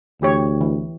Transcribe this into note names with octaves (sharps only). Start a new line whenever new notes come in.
D2 E3 G4 C#5
E3